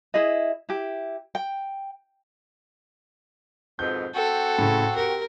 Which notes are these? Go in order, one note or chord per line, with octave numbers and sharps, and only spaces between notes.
E4 G#4 D#5
E4 G4
G5
F2 G#2 B2 G6
C4 F#4 A4
A2 C#3
G4 A#4